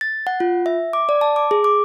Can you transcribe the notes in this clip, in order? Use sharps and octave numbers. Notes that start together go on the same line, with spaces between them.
A6
F#5
F4
E5
D6
D5
A5
D6
G#4
D6